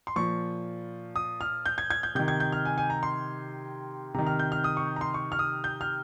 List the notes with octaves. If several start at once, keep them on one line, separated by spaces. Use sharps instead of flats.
C6
A#2 F3 C#6
D#6
F6
G6
G#6
G#6
G6
C3 D#3 G6
G#6
G6
F6
G#5
G#5
A#5
C6
C3 D#3 A#5
F6
G6
F6
D#6
C#6
A#5
C6
C#6
F6
D#6
G6
F6